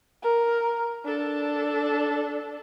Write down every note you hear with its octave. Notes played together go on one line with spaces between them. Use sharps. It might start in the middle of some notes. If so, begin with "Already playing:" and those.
A#4
D4 A4